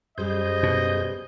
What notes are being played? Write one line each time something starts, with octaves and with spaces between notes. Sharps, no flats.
F#2 G3 G#4 C5 D#5 G6
B2